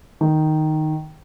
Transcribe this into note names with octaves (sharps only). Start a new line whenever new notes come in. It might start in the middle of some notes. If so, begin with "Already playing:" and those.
D#3